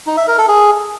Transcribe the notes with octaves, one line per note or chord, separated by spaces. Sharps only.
D#4
E5
A#4
A4
G#4